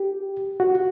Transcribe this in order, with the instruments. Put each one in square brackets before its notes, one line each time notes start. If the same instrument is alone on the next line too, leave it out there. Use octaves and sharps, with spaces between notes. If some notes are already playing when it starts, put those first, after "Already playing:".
Already playing: [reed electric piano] G4
F#4